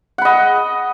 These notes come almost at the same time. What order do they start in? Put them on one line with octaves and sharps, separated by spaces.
F#5 B5 D#5